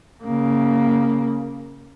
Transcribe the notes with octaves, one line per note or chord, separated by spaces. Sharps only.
C#3 A#3